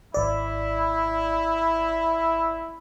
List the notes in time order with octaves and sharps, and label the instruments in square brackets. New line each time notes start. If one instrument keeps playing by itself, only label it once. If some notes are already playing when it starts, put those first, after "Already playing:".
[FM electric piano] G#1 D5 [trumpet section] E4